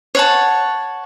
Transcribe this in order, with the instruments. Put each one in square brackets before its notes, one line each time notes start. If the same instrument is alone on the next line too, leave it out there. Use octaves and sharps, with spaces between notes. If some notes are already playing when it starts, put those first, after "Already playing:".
[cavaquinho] C#5 F#5 A5